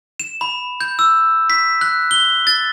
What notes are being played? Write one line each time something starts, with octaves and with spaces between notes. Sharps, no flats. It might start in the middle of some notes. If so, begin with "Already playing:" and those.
E7
B5
G6
E6
B6
F#6
G7
A6